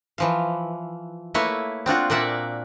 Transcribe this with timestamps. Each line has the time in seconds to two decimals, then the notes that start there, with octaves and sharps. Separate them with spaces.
0.18 E3 F3 F5
1.34 A3 A#3 E4 B4 C#5
1.86 C4 D4 F4 F#4
2.10 A#2 A#3 D5 E5 F#5